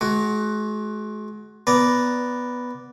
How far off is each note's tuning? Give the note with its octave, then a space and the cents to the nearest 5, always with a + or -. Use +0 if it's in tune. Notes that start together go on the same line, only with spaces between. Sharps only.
G#3 +40 F#4 +10
B3 +0 D5 -5 A#5 +0